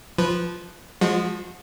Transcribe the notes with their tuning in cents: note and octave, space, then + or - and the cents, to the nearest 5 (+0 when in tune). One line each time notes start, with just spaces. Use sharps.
F3 +0 B4 +0
F3 +0 G#3 -15 F#4 -35